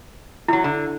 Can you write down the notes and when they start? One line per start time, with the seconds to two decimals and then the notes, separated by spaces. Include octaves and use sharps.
0.48 E2 F#3 E4
0.64 D3